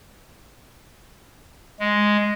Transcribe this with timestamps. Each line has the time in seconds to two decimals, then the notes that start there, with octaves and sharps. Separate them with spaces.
1.79 G#3